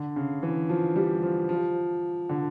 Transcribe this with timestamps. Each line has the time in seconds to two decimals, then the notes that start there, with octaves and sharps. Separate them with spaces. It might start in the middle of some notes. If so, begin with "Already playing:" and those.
Already playing: D3
0.16 C#3
0.43 E3
0.69 F3
0.96 G3
1.22 F3
1.49 F3
2.29 D3